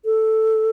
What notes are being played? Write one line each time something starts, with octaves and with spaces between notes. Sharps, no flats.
A4